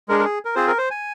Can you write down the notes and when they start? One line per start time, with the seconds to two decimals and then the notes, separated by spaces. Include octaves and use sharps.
0.08 G#3 D4 G#4 A#4
0.19 A#4
0.25 G#4
0.45 A#4
0.55 C4 F4 G#4 C5
0.67 A#4
0.78 C5
0.91 G#5